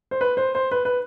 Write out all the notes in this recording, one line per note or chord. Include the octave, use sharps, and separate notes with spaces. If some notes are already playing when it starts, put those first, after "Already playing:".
C5
B4
C5
C5
B4
B4